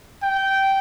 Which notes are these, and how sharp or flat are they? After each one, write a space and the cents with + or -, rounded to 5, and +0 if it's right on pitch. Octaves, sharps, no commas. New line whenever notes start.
G5 -15